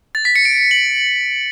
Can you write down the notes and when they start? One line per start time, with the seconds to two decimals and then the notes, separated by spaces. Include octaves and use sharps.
0.15 A6
0.25 B6
0.36 C#7
0.45 D7
0.71 F#7